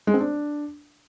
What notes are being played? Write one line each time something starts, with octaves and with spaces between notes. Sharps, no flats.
G#3
C4
D4